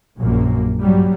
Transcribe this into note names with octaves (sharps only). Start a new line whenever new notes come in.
A#1 F#2 A#2 A#3
G2 F#3 G3